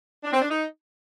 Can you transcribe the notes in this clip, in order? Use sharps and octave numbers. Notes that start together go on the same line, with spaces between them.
D4
C4
D4
D#4